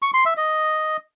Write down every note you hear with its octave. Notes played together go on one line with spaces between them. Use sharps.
C#6
C6
E5
D#5